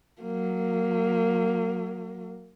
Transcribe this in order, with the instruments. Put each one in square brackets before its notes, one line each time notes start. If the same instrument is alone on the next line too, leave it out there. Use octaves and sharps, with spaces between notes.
[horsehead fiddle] F#3 A#3